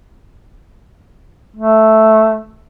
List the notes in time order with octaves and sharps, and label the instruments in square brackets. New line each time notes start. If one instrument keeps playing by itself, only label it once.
[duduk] A3